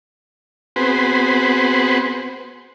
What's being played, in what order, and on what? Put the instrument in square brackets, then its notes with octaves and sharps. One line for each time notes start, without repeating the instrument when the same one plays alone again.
[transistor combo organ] B3 C4 F#4 G#4 B4 C5